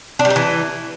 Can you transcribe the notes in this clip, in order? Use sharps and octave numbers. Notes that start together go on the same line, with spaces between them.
D4
G3
D#4
E3